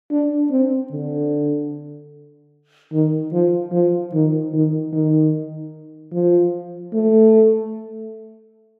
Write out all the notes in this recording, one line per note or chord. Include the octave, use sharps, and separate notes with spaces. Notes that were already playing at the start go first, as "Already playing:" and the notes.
D4
C4
D3
D#3
F3
F3
D#3
D#3
D#3
F3
A3